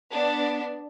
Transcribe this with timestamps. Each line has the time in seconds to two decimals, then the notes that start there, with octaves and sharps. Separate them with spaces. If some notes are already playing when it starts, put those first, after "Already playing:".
0.11 B3 D4